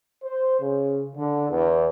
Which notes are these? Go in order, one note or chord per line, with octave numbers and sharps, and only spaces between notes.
C5
C#3
D3
E2